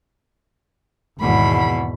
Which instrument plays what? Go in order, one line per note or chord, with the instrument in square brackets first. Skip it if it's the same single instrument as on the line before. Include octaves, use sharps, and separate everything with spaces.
[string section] G#1 [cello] E2 B2 [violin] B5